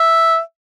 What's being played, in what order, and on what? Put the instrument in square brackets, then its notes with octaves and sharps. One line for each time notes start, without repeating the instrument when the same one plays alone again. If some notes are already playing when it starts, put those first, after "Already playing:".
Already playing: [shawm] E5